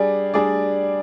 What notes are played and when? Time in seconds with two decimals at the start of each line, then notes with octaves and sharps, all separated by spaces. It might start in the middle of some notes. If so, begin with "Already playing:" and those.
Already playing: G3 D4 G#4 D5
0.34 G3 D4 G#4 D5